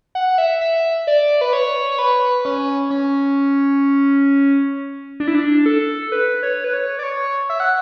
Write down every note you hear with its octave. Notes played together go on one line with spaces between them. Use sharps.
F#5
F#5
E5
E5
D5
B4
C#5
C#5
B4
C#4
C#4
D4
E4
D4
A4
B4
C#5
B4
C#5
D5
C#5
E5
F#5